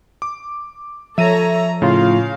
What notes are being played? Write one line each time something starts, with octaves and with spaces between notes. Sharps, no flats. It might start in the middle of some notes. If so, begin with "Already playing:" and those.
D6
F3 A4 C#5 E5 A#5 D#7
A2 C#3 F4 F5